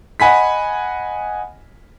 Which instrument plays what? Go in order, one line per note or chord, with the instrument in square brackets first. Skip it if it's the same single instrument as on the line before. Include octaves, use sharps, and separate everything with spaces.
[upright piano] D#5 F#5 G#5 B5 B6